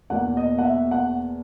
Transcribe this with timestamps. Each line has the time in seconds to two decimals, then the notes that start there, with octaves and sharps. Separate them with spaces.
0.10 E2 B2 A#3 F#5
0.37 D#5
0.59 F#5
0.63 E5
0.91 F#5